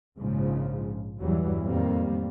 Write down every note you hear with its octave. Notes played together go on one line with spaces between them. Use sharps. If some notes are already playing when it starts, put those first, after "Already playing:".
A#1 G#2 C#3 F3
E2 G2 E3 F#3 G3
F2 A2 D#3 G3 A#3